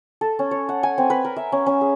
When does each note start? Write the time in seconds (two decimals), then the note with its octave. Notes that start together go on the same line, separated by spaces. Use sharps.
0.21 A4
0.39 C#4
0.51 C#5
0.69 F#5
0.83 G#5
0.98 C4
1.10 B4
1.25 A#4
1.36 E5
1.52 C#4
1.66 C#4
1.81 G#4